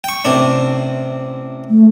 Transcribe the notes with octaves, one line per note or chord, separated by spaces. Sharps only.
G5 C#6
A1 C3 D4
A3